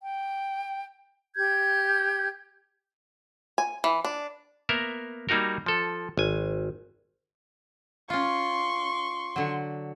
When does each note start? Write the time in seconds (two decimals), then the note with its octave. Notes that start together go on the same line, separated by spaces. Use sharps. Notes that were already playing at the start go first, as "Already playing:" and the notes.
0.02 G5
1.36 G4 G6 G#6
3.58 G#5
3.84 E3
4.05 D4
4.69 A#3 B3 A#4 E5
5.29 G3 A#3 D#4 F#4 A#4
5.66 F3 A4
6.18 G#1 G#5
8.10 C#4 F4 C6 C#6
9.36 D3 F#3